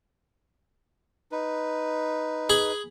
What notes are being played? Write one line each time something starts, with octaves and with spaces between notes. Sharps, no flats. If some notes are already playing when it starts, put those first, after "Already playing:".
D#4 B4
G#4 B5